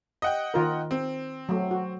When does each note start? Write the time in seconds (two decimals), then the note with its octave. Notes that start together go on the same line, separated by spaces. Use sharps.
0.22 D#5 F#5 G5
0.54 D#3 F4 A#4
0.91 C4
1.49 F#3 A3
1.71 F#4